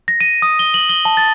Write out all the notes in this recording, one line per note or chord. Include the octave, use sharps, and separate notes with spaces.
A#6
D#7
D#6
G7
F#7
G7
A5
A6